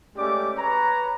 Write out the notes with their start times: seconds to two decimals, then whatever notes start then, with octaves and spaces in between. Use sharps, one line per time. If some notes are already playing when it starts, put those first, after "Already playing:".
0.16 G#3 A3 C#4 G4 D5 D6
0.57 B4 C#5 A#5